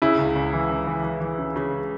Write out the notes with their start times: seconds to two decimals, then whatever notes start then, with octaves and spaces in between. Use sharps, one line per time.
0.02 C#3 E4
0.19 C#2
0.36 C#2
0.53 E3
0.70 C#2
0.87 E3
1.04 E3
1.21 E3
1.39 C#3
1.56 C#3